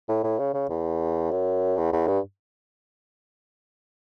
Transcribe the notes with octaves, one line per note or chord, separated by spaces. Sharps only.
A2
A2
C#3
C#3
E2
F#2
E2
E2
G2